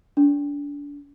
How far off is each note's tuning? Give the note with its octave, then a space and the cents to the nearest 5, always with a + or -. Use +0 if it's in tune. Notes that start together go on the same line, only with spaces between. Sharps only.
D4 -30